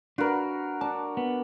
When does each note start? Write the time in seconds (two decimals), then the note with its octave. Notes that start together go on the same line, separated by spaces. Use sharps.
0.18 D4 F#4 A#4 B4
0.81 D4 A5
1.17 B3